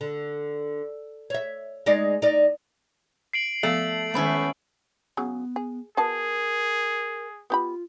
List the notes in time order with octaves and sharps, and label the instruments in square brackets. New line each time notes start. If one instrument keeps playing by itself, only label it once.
[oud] D3
C#5 E5
G#3 D#4 D5
D#4 D5
[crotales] C7 D7 F#7
[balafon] F3 B3 F5 [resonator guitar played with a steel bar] A3 [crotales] F#7
[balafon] D#3 G#3 [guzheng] B3 C#4 E4
[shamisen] C#3 F#3 G#4 [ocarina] B3
[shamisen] G#4
[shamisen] B3 F#4 A5 [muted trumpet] G#4 [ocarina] A#4
[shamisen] B3 G4 B5 [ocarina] F4